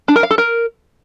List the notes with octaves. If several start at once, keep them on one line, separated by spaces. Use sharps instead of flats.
D4
A#4
F5
A4
A#4